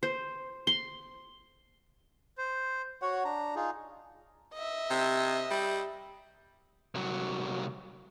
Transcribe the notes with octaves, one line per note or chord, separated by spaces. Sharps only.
C5
C6
C5
F#4 C#5 F#5
D4 A#5
D#4 F4 G#4
D#5 E5
C3
G3
C2 F#3